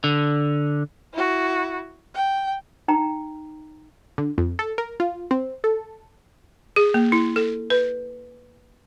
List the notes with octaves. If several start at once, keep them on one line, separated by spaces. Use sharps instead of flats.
D3
E4 F#4
G5
D#4 G5 A#5
D3
F2
A4
A#4
F4
C4
A4
G#4
A#3
E4
A4
B4